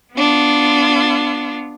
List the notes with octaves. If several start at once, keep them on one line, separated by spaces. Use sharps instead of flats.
B3 D4 F4